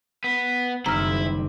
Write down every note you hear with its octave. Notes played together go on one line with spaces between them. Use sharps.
B3
F#1 D#3 G3 C4 E4 A#5 F6